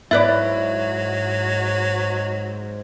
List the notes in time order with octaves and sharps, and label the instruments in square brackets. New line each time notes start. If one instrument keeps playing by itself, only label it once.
[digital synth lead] G#2 [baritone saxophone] F#3 [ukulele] E4 B4 D5 [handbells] E5